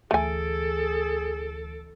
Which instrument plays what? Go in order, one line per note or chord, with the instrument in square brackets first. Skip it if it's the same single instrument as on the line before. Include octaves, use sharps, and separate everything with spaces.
[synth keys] D2 E3 D7 [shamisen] A3 G#5 [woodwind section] G#4 [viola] A4